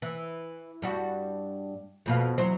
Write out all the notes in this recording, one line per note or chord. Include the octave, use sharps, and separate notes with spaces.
E3
G2 G3 F#4
F2 B2 F5
E2 F#3 C5